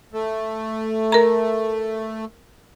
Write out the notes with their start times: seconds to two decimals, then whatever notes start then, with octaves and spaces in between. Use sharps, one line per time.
0.13 A3
1.12 A#4 A#5